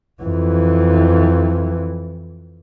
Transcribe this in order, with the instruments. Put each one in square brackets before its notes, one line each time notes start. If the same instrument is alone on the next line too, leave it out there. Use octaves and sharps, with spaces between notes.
[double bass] F2 E3